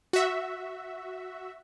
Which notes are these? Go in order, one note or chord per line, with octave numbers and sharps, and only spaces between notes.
F#4 E5